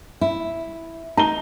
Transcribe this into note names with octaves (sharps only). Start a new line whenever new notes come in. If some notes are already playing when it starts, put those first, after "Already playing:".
E4
D#4 A#5 G7